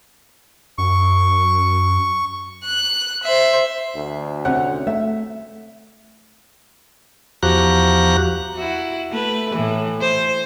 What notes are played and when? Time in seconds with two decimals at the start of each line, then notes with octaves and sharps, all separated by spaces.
0.78 F#2 C#6
2.64 F#6
3.23 C5 E5
3.96 D2
4.45 C3 C#4 F#5
4.87 A3 E5
7.43 E2 F3 F#4 G4 A#5 F#6
8.55 E4 F#4
9.11 A3 B4
9.54 A2 E3
10.01 C5